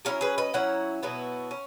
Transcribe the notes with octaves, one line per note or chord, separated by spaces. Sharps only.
F#3 C#4 E4 F#4 A#4
G#4 B4
B4 D#5
F#3 C#4 E4 F#5 A#5
B2 F#3 B3 E4
C#4